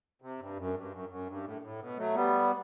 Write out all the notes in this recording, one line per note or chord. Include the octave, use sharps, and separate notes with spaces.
C3
G2
F#2
G2
F#2
F#2
G2
A2
A2
B2
F#3 A3
G3 B3